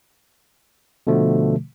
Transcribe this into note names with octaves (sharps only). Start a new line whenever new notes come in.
B2 D3 F3 A3